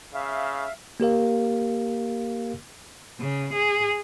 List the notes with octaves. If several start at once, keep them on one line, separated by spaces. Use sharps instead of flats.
C#3 E5 F5
A#3 G4 A#4 F5
C#3
G#4